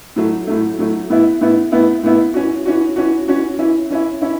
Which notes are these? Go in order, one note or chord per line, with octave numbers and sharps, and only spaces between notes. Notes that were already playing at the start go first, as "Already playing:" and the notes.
A2 F#3 A3
A2 F#3 A3
A2 F#3 A3
A2 E3 B3 E4
A2 E3 B3 E4
A2 E3 B3 E4
A2 E3 B3 E4
E3 C#4 F#4
E3 C#4 F#4
E3 C#4 F#4
E3 C#4 F#4
E3 C#4 E4
E3 C#4 E4
E3 C#4 E4